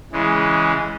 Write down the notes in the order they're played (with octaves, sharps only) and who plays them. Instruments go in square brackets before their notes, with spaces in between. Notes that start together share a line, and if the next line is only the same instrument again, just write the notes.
[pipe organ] C#3 E3 G#3